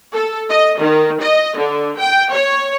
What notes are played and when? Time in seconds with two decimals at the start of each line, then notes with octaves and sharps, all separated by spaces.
0.14 A4
0.50 D#5
0.81 D#3
1.22 D#5
1.57 D3
1.98 G5
2.33 C#5